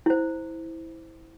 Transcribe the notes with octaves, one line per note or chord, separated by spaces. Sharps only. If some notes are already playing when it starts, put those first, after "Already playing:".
E4 C5